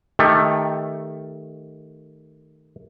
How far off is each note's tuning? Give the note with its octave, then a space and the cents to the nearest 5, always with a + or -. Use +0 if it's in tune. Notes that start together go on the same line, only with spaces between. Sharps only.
D#3 +0 A3 +0 G4 +25